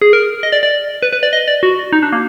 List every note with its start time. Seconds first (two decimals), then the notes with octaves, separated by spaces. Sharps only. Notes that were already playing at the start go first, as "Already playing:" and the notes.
0.02 G#4
0.13 A#4
0.43 D#5
0.52 D5
0.63 D5
1.02 B4
1.13 B4
1.23 D5
1.33 D#5
1.48 D5
1.63 F#4
1.93 D#4
2.03 D4
2.12 A#3